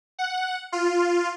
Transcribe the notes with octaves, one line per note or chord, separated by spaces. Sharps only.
F#5
F4